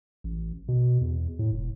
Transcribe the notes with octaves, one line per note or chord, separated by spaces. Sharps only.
A1
B2
E2
A2
E1